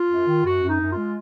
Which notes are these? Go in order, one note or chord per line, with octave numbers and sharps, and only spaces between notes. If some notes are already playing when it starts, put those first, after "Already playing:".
Already playing: F4
F#2
D#3
F#2 F#4
F#2
D#4
F#2
F4
G#3